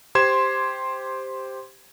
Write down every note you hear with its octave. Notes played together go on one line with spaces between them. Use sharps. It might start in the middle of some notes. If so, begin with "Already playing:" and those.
G4 C5 C6 G#6 E7